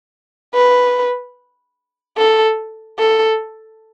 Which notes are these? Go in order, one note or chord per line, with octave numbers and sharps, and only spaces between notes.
B4
A4
A4